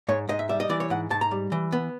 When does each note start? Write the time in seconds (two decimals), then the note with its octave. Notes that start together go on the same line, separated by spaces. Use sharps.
0.08 G#2 C#5
0.29 G#2 D#5
0.39 E5
0.49 G3 E5
0.60 D#5
0.69 E3 D5
0.80 C#5
0.90 G#2 F#5
1.10 G#2 A5
1.21 A#5
1.31 G3
1.52 E3
1.72 B3